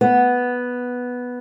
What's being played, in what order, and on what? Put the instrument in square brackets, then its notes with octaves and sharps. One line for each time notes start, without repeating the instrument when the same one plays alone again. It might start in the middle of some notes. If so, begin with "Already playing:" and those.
[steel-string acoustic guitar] B3